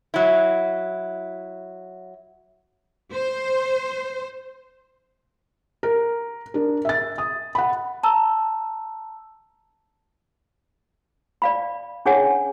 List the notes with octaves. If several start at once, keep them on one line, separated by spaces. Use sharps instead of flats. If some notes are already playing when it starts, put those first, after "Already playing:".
F#3 E4
C5
A#4
D4 A#4
E5 A6
D#6
F#5 B5
A5 A#5 E6
D5 F5 B5
C#4 D4 G#4 C#5 F#5 G#5